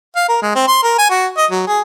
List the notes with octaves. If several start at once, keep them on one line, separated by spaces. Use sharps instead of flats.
F5
A#4
G#3
C4
C6
A#4
G#5
F#4
D#5
F#3
G#4